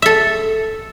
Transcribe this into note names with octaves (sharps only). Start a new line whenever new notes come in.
A4 E5